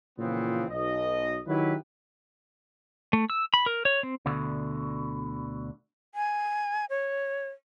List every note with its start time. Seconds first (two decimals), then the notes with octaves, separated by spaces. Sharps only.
0.19 A#2 C#3 E3 F3 B3 C4
0.68 B1 D#5
1.47 D#3 F#3 E4 G4 B4
3.13 A3
3.30 E6
3.54 B5
3.66 A#4
3.85 C#5
4.03 C4
4.26 D2 B2 D3
6.15 G#5
6.90 C#5